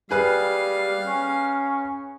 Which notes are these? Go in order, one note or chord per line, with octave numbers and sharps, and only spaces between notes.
G3 G#4 B4 F5
C#4